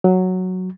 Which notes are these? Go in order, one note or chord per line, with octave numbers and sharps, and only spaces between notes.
F#3